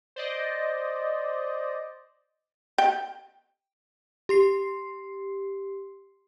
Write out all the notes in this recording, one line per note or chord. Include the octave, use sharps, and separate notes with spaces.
C5 D5 D#5
G5
G4 C6 C7